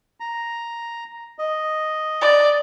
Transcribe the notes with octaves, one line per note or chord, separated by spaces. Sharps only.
A#5
D#5
D5